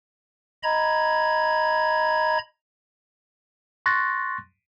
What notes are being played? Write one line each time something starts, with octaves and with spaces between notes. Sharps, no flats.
D#5 A#5 B5 G#6
C6 C#6 F#6 A6 A#6